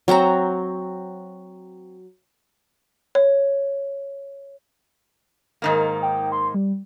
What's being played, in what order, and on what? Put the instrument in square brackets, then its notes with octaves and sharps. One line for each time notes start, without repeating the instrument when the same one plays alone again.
[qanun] F#3 C4 F#4 A#5
[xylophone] C#5
[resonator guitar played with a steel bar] G#2 D#3 A#3 [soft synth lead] A#4
[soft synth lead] G5
C6
G3